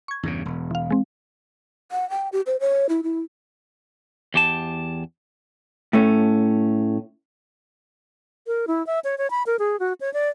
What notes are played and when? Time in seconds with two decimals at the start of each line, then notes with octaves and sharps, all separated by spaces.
0.08 C#6 G#6
0.23 E2 G2 C#3
0.45 E1
0.71 E3 F5
0.90 G#3 C4
1.92 F#5
2.10 G5
2.32 G4
2.46 C5
2.60 C#5
2.89 E4
3.03 E4
4.34 E2 G4 A5
5.93 A2 A3 C#4
8.47 A#4
8.67 E4
8.87 E5
9.04 C#5
9.18 C#5
9.31 B5
9.47 A#4
9.59 G#4
9.80 F#4
10.01 C#5
10.14 D5